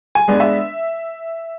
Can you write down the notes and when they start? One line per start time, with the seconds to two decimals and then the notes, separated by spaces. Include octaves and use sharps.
0.15 G#5
0.28 G#3 B3 D4
0.40 E5